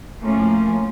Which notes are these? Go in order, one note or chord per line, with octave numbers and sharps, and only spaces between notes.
A2 F3 A#3 C#4